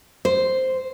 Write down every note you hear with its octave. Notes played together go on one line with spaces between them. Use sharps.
C5